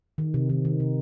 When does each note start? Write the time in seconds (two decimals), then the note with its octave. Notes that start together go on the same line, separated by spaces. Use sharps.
0.18 D#3
0.34 C3
0.49 D#3
0.65 D#3
0.80 C3